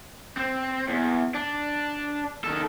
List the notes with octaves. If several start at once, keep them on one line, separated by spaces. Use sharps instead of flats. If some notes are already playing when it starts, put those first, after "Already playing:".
C4
E2
D4
D#3 A4